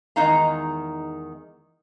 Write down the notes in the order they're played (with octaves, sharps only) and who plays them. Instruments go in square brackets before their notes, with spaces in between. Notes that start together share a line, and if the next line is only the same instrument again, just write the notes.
[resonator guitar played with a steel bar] E2 D#3 G#3 D#4 F5 A#5